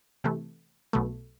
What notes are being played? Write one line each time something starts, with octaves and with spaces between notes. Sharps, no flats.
C3 E3 A3
B1 B2 A3